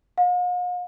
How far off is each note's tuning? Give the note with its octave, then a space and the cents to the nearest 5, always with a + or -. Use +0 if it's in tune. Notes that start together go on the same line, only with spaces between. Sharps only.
F5 +45